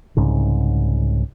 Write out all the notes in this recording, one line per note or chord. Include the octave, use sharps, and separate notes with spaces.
C2 G#2 C#3